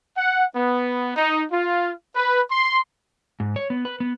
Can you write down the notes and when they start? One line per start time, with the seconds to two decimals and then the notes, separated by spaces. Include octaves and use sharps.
0.17 F#5
0.55 B3
1.16 D#4
1.52 F4
2.16 B4
2.50 C6
3.40 G#2
3.56 C#5
3.70 B3
3.85 B4
4.00 B3